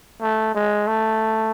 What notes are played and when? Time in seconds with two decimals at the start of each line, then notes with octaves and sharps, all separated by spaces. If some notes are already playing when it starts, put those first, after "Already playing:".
0.22 A3
0.55 G#3
0.87 A3